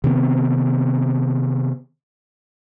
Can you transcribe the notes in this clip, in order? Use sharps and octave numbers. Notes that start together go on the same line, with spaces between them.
C3 D#3 B3 C4